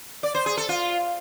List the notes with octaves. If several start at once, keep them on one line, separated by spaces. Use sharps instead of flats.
D5
C5
G#4
A4
F4